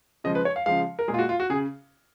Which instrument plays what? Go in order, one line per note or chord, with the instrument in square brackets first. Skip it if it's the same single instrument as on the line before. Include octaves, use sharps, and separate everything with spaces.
[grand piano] C#3 F3 G#3 D#5
B4
C#5
F5
C#3 F3 G#3 F5
A#4
A#2 G#3 G#4
F4
F#4
F4
F#4
C#3 G#4